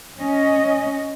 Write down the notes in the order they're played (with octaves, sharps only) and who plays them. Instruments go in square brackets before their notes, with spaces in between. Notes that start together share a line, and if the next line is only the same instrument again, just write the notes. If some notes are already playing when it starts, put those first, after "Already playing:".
[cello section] C#4 D#5